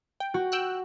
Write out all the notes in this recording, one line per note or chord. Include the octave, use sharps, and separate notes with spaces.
G5
F#4
G5 E6 F#6